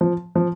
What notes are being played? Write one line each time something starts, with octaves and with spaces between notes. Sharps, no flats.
F3
F3